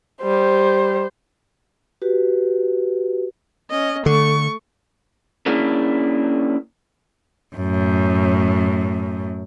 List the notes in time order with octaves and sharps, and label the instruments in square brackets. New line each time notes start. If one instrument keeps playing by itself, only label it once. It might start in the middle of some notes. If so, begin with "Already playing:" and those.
[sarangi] G3 [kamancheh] C5
[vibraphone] F#4 G4 B4
[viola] C#4 D#5
[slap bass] D3 [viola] A3 C#6
[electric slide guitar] A#3 C#4 D4 E4 G#4 A#4
[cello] F#2 A2